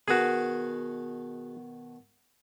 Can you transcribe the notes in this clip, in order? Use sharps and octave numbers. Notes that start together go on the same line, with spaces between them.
B2 D#3 B3 F#4 G#4